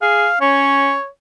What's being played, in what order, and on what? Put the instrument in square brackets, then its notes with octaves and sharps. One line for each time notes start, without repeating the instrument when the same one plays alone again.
[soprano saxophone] G#4 [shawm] F5
[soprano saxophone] C#4 [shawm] C#5